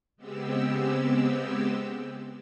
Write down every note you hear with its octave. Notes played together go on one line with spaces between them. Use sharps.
C#3 G#3 B3 C4 G4 E6